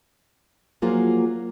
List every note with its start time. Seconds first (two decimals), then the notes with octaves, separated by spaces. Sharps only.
0.82 F3 F#3 A#3 F4 G#4